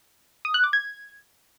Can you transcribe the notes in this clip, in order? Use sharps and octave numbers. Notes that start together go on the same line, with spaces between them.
D#6
F#6
D6
G#6